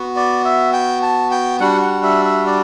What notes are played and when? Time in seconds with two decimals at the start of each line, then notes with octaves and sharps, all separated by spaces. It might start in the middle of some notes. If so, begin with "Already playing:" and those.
Already playing: B3 F#4
0.16 D5
0.45 E5
0.73 G5
1.02 A5
1.31 G5
1.60 G3 D4 F#4 F#5
1.81 F#5
2.03 E5
2.25 E5
2.46 D5